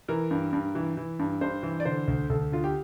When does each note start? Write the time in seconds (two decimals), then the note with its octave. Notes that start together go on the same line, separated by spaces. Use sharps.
0.08 E3 A#4
0.31 G2
0.53 G2
0.75 E3
0.97 E3
1.19 G2
1.41 G2 C5
1.63 E3
1.80 D5
1.85 D3 C5
2.08 D2
2.30 D2 A4
2.52 D3 F4
2.64 G4